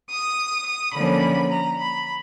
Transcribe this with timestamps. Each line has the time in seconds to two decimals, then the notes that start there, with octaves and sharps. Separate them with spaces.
0.10 D#6
0.66 D#6
0.94 D3 F3 A#3 C#4 B5
1.51 A#5
1.79 B5